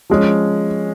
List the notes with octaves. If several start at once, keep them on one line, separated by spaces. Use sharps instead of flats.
F3 G#3 C#4